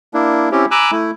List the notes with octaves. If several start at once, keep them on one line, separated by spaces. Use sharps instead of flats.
A#3 D4 E4
C4 C#4 E4 G4
G#5 A#5 B5 D6 E6 F#6
A3 E4